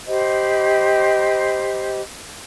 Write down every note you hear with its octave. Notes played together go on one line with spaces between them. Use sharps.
G4 C5 D#5 B5